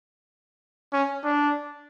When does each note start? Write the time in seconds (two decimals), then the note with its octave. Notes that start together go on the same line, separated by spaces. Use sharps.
0.93 C#4
1.24 D4